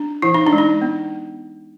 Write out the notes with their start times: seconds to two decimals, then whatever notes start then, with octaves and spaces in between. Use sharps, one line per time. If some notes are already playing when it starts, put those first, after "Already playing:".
Already playing: D4
0.22 E3 E4
0.34 D#4
0.47 D4
0.53 G#3
0.58 D#4
0.81 B3